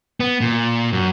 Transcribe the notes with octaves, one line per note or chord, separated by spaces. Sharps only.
B3
A#2
F#2